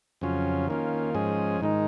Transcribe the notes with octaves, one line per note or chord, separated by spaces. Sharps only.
F2 C#3 F#3 C#4 F4
D#3 A#3 C#4 F4
G#2 F3 G#3 C#4 G#4
G#2 D#3 G#3 D#4